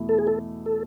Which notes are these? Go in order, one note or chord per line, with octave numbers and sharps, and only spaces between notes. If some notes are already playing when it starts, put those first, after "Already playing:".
Already playing: E2 B2 A3 E4
A4
G#4
A4
A4